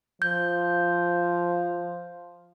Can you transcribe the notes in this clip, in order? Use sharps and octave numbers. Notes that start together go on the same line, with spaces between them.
F3 G6